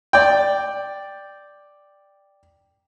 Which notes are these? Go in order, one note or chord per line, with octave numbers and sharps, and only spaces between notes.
D5 G5